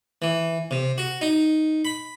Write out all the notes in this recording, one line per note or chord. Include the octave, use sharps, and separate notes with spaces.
E3
C3
F#4
D#4
B5